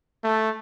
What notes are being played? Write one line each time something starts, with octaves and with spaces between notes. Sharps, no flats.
A3